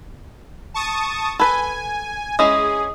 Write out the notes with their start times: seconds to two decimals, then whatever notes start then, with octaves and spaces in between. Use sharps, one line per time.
0.74 A5 C#6 D#6
1.39 A4 B4 G#5 B5
2.39 G#3 C#4 E4 G#4 D#5 D#6